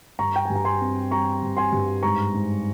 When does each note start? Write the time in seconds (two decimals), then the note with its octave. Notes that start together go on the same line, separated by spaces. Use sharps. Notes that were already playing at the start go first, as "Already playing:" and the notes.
0.19 G2 A#5 C#6
0.36 G5
0.45 G#5
0.50 G2
0.55 A#5
0.65 G#5 C6
0.81 C4
1.11 G3 A#5 C#6
1.42 G2
1.57 G#5 C6
1.72 G2
2.03 G#2 A#5 C#6
2.34 G#2